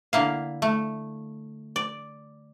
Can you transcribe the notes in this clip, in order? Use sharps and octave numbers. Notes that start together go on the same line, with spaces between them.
D3 A#3 E4 F5
A3
D5